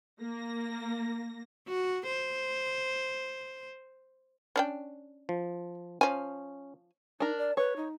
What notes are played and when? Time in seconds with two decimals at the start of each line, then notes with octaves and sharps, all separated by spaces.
0.21 A#3 A#6
1.68 F#4
2.06 C5
4.56 C#4 D4 G5
5.29 F3
6.01 F3 C#4 G#5
7.20 D4 D#4 A#4
7.38 D5
7.57 B4 C#5
7.76 D#4